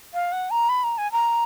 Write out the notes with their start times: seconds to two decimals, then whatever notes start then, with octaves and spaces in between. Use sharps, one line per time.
0.14 F5
0.32 F#5
0.51 A#5
0.69 B5
0.84 A#5
0.98 G#5
1.12 A#5